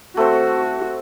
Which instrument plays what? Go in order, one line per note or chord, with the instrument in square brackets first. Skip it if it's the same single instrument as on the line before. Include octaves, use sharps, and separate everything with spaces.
[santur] A3 C4 C5 [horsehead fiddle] F#4